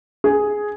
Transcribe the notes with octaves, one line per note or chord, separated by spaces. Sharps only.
G#4